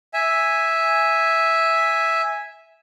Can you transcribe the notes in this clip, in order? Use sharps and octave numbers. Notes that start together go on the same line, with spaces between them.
E5 G#5